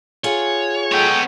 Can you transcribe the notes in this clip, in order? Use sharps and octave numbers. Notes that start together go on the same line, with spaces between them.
F4 G#4 C#5 F#5
G#3 B3 A4 C#5 G5